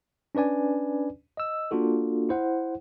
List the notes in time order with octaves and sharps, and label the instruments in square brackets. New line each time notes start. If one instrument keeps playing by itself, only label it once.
[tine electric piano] C#4 D4 B4 D5 G#5
D#5 E6
A#3 D4 F4 F#4 A4
E4 C5 F#5